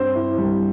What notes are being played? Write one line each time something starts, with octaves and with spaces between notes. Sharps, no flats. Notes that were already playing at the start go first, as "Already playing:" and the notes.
Already playing: G2 C4 C5
E4
G3